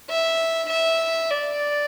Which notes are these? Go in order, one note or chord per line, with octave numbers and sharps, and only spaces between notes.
E5
E5
D5